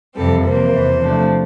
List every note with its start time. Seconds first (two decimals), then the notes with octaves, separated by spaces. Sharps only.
0.15 F2 C3 E3 G3 C4 A4
0.43 C3 E3 A#3 C5
0.71 E2 C3 E3
1.00 C3 F3 A3 D4